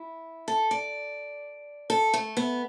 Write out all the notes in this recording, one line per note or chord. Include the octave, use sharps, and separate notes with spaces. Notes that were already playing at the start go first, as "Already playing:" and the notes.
Already playing: E4
A4
D5
A4
A3
B3